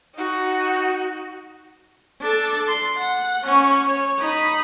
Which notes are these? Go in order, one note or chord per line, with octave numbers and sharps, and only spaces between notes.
D#4 F#4
D4 A4
C6
F#5
C#4 C#6
C#5
D#4 B5